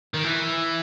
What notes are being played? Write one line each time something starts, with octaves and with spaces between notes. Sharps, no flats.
D#3
E3